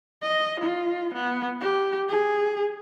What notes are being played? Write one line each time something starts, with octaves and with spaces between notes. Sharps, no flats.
D#5
F4
B3
G4
G#4